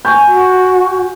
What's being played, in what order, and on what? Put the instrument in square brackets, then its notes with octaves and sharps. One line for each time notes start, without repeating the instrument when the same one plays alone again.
[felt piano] G#5 C#6 G6
[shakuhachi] F#4